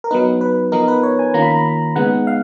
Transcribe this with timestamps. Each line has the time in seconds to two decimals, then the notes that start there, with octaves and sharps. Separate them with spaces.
0.04 A#4
0.11 F#3 B3 D#4 B4
0.41 B4
0.72 F3 B3 D#4 A#4
0.88 B4
1.03 C#5
1.19 G#5
1.34 D#3 A#3 C#4 F4 A#5
1.42 B5
1.51 A#5
1.96 C#3 G#3 B3 D#4 F#5
2.27 F5